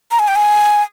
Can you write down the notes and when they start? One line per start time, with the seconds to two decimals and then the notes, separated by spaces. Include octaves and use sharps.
0.11 A#5
0.19 G#5
0.28 G5
0.35 G#5